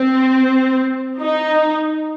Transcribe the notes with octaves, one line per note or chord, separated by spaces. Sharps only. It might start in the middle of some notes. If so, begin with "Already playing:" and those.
Already playing: C4
D#4